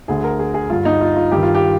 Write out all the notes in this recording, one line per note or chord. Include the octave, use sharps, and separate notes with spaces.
D2 D3 G#4
A#4
G#4
G#4
G2 D3 F4
D#4
F4
F4
G2 D#3 G4
F4
G4